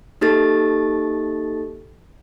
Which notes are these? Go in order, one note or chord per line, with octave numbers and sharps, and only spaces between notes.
A#3 D#4 G4 A4 A6